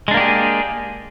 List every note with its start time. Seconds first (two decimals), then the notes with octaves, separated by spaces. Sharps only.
0.08 G#3
0.11 D4
0.14 A#3
0.17 G4
0.20 G#4